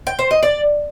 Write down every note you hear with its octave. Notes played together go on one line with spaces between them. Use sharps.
G5
C5
D#5
D5